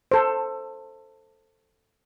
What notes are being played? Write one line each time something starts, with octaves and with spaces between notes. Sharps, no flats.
A4 C5